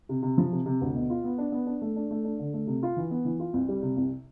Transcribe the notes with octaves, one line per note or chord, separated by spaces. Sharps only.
C3
C3
F3
C3
C3
D2
B2
F4
B3
D4
B3
D4
A3
D4
A3
D4
D3
A3
C3
F4
E3
B3
E3
F4
C2
G3
C3
C2